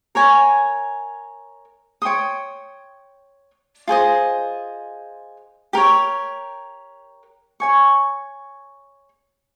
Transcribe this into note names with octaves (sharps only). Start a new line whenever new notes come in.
A#4 C#5 G#5
C#5 G5 C6 D#6
F4 G#4 C5 D#5
G4 A#4 C#5
C#5 G#5 C#6